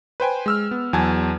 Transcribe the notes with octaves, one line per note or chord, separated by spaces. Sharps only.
B4 C5 G5 G#5
G#3 E6 F6
B3
E2 F#3 G#5 A5 G#6